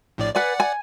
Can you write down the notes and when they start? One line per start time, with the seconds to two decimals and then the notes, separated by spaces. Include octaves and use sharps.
0.18 A#1 A2 D5
0.36 B4 D5 F#5 G#5
0.60 G#5